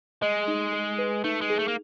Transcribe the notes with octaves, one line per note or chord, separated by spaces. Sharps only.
G#3 D#5
D#4
G#4
B4
A3 D#4
G#3
G#4
A3
A#3